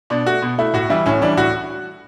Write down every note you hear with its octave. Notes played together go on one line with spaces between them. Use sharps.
B2 D4
A3 F#4
B2
A3 E4
A2 F#4
E3 G3 E4
A2 C#4
E3 G3 D4
A2 F#4